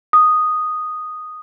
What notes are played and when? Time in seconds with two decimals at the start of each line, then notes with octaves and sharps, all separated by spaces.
0.13 D#6